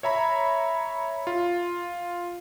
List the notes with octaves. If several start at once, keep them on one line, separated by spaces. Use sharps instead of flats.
C#5 E5 A#5 B5
F4